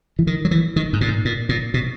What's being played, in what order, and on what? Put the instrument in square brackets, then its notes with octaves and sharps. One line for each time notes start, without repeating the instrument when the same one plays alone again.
[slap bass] E3
D#3
F#3
E3
D#3
G#2
A#2
G#2
A#2
A#2
B2